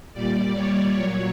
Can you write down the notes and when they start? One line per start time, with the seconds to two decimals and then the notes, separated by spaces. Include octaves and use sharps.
0.13 A#2 G3 D5
0.54 C#5
0.94 A#2 F#3 C#5